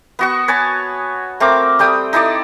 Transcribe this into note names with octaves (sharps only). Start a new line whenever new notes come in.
B3 F#4 C#6
B4 C#5 G#5 A5
A3 C4 A#4 D6
G3 A3 G5 D#6
D#4 E4 A4 D5